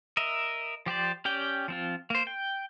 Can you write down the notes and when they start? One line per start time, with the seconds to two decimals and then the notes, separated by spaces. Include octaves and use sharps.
0.17 A#4 D#5 E5
0.86 F3 G4 C5 D5
1.25 C#4 G4 D5 G5
1.68 F3 C4 F4
2.10 A#3 C5
2.27 G5